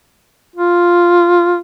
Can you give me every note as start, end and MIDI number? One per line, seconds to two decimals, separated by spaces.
0.56 1.60 65